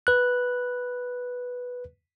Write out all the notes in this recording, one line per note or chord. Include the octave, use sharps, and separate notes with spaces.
B4 F#6